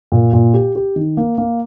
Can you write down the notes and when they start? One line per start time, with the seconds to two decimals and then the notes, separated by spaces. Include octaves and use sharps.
0.12 A#2
0.33 A#2
0.54 G4
0.75 G4
0.96 D#3
1.17 A#3
1.38 A#3